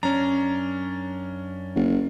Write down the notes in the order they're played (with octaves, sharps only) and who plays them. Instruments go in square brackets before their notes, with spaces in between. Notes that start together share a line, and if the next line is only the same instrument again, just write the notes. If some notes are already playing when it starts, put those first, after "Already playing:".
[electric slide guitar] F#2 D4 [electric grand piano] C#4 A#5
[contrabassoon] F#1